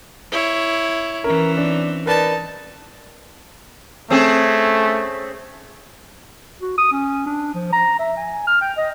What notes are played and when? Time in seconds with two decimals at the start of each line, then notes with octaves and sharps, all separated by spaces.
0.32 E4 C#5
1.24 E3 C#4 A#4
1.57 C4 D4
2.06 D#4 A#4 B4 D5 A5
4.10 A3 C4 C#4 G#4
6.62 F#4
6.78 D#6
6.92 C#4
7.26 D4
7.54 F3
7.73 A#5
7.99 E5
8.17 G#5
8.47 F6
8.62 G5
8.77 D#5